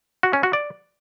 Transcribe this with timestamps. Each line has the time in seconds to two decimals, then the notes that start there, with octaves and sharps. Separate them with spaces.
0.23 F#4
0.33 C#4
0.43 F#4
0.53 D5